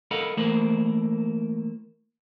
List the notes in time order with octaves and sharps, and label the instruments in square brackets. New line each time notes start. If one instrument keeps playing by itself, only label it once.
[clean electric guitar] A4 A#4 D#5 F5 F#5 B5
E3 A3 A#3 A#4 C5 B5